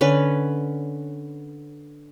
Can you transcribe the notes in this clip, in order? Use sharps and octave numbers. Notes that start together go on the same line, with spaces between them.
D3 C#4 B4